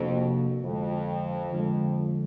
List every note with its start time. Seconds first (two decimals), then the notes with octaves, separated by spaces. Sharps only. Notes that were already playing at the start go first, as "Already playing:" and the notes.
Already playing: F2 C3 F3 A#3 D4 F#4
0.63 F2 D3 F3 G#3
1.52 D3 F3 G#3